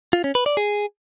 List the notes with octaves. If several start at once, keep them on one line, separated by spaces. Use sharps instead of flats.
F4
C#4
B4
D5
G#4